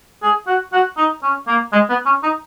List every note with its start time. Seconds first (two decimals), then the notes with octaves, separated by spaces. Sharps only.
0.23 G#4
0.47 F#4
0.73 F#4
0.97 D#4
1.23 C#4
1.47 A#3
1.72 G#3
1.90 B3
2.06 C#4
2.23 D#4